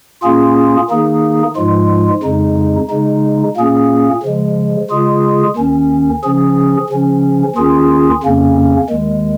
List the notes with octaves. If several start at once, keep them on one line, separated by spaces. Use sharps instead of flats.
A#2 A#3 C#4 F4 G#4
D#3 A#3 D#4 G#4
G#2 F3 G#3 F4
F2 C#3 G#3 D#4
C#3 G#3 D#4
A#2 A#3 C#4 G#4
C#3 F3 G#3
C#3 G#3 F4 G#4
D#2 D#3 C#4
C#3 F3 C#4 G#4
C#3 F3 C#4
D#2 D#3 C#4 F4 G#4
F2 C#3 A#3 C#4
D#2 D#3 G#3